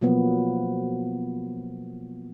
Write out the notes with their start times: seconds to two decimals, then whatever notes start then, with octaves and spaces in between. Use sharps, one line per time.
0.01 B2 F3 F#3 A#3 B3